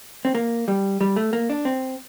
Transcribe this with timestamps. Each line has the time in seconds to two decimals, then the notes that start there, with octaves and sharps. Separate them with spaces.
0.25 C4
0.35 A#3
0.68 G3
1.01 G3
1.16 A3
1.33 A#3
1.50 D4
1.65 C4